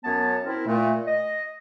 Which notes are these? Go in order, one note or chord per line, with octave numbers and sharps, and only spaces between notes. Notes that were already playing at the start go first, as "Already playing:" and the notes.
F#2 B3 C#5 A5
C4 E4 A#4
A#2 A3
D#5